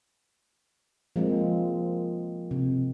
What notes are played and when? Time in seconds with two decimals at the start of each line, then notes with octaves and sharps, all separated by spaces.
1.16 F3 G#3 A#3 C4
2.51 C3